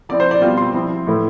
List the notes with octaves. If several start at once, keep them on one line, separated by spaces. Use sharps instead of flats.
F3 C4 E4 D5
C5
D5
B2 G3 C4 F4
C6
F3 C4 E4
A2 E3 A3 E4